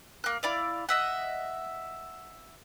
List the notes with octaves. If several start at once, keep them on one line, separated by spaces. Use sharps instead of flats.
A#3 F#6
E4 D5 F5
D#5 E5 F#5